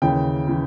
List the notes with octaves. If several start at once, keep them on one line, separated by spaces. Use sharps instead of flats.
D#2 C#3 E3 G5
C#3 E3